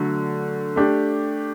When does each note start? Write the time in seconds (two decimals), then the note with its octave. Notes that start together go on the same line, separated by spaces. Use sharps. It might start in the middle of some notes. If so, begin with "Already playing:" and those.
Already playing: D3 F#3 A3
0.76 A3 D4 G4